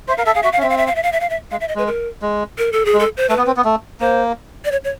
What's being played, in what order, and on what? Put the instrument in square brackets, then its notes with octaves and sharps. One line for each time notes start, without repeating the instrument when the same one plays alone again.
[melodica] C5 [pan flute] E5
[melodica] A#4 [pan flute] F5
[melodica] A4 [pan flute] E5
[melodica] G#4 [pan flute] F5
[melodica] F#4 [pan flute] E5
[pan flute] F5
[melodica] C#4
[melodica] C4 [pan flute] E5
[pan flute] F5
E5
F5
E5
F5
E5
F5
E5
[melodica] G#3 [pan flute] F5
[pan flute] E5
D#5
[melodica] G#3 [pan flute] B4
[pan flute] A#4
[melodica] G#3
[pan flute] A#4
A4
G#4
[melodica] G#3
[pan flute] A4
C5
[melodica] A3 [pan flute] B4
[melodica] B3
C4
B3
A3
[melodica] A#3 [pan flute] C5
[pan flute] D5
C#5
C#5